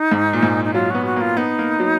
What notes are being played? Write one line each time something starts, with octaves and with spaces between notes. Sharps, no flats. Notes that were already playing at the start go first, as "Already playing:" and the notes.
Already playing: D#4
G#2
A#2
G#2
D#4
F#3 F4
B3 F#4
F#4
A#3 F4
B3 D#4
A#3
F#3